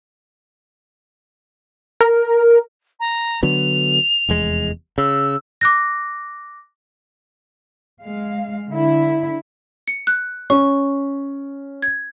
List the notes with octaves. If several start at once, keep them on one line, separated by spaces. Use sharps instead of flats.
A#4
A#5
D3 F#3 B3 F7
F1 E2 G#3
C#3 E6
D6 F#6 A#6
G#3 F5
D3 E4
C#7
F#6
C#4 C#6
G#6